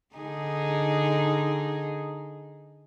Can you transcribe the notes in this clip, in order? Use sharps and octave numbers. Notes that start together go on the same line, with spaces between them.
D3 D#4 G#4